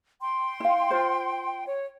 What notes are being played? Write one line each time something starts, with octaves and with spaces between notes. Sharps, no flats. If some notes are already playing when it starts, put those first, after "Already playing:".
G5 C6
E4 F5
F4 C5
C#5